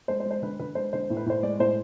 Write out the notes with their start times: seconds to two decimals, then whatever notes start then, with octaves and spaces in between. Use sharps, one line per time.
0.08 G#3 C5
0.20 C5
0.26 G#3
0.31 C5
0.42 D3 B4
0.59 D3 B4
0.75 G#3 C5
0.93 D3 C5
1.10 A2
1.17 B4
1.26 A2 C5
1.43 G#3 D5
1.59 A2 C5